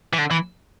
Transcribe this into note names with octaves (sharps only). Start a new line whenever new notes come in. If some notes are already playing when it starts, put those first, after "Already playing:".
E3
D3
E3